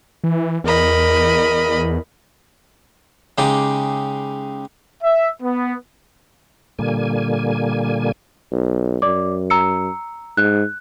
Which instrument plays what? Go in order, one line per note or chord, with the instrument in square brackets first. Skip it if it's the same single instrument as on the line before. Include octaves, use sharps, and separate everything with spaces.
[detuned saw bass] E3
[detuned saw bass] E2 [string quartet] A#4 D#5 B5
[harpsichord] C#3 G#3 D#4 G4 D6
[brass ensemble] E5
B3
[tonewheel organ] A#2 D3 G3 A#3 G#5
[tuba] B1
[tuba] F#2 [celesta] D5 D6
[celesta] A#5 E6 C#7
[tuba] G#2 [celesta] F#6